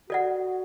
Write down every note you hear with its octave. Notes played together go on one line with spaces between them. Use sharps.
F#4 A4 D5 F#5